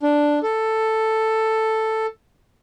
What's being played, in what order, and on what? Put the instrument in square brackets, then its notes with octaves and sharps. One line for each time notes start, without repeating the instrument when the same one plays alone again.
[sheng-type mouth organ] D4
A4